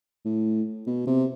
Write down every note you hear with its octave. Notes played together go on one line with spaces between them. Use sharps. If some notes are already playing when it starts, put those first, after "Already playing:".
A2
B2
C3